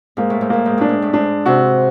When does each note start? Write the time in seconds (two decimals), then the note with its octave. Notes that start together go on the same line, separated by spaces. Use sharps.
0.17 G#2 A#3
0.30 A2
0.41 G#2
0.50 A2 A#3
0.65 G#2
0.78 A2 D4
0.89 G#2
1.02 A2
1.13 G#2 D4
1.46 C3 F#4